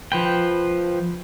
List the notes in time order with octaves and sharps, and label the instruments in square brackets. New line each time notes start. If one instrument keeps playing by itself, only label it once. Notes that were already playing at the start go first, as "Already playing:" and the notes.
[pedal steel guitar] F3 B4 G5